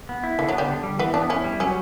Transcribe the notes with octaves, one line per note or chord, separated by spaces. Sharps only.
B3
E4
D3 E3
F#3
G3 B3
D3
G3
E3 B3
B3 D4
C#4 E4
G3
F#3 C#4